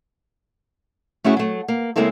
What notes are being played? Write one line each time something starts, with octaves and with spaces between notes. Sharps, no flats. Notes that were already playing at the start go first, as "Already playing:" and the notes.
A3 C#4 E4 F#4 G#4
F#3 A3
A#3
C#3 G#3 A#3 C4 E4 A4